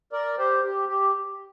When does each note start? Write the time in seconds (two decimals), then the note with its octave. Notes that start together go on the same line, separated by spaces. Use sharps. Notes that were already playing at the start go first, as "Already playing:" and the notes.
0.13 A#4 D5
0.38 G4 C5
0.63 G4
0.88 G4